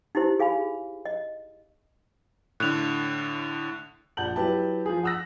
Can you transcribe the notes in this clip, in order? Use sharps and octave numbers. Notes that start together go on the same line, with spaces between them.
D#4 E4 G4 C5
G#4 F5 G#5 B5
D#5
A2 D3 F#6 F7
A#1 D5 F#5 A5 G6 F#7
F#3 E4 G4 B4 E5 A5
F3 G#4
F#5 D#6 E6 F#6 A#6